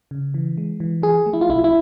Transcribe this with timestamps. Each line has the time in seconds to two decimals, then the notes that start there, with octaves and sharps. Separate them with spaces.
0.11 C#3
0.34 E3
0.58 G#3
0.80 E3
1.02 F3 G#4
1.26 A3
1.33 E4
1.41 F4
1.49 B1 E4
1.64 E4